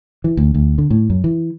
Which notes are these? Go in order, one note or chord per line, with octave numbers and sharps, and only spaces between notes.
E3
D2
D2
D3
A2
F#2
E3